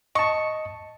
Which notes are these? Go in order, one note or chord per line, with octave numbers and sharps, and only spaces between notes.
D#5 A5 C#6